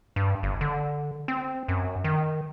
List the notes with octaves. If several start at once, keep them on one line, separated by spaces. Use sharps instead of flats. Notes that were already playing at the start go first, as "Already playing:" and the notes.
G2
G1
D3
C4
F#2
D#3